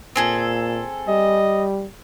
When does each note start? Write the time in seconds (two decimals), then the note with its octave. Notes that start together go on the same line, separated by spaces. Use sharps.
0.16 A#2 C4 G#4 A4
1.08 G3 D#5